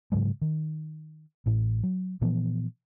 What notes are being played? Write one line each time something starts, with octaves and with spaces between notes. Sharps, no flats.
G#2 C#3 F#3 G#3
D#3
A1 A2
F#3
A#2 E3 F3 B3